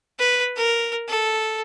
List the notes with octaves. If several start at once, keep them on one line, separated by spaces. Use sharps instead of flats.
B4
A#4
A4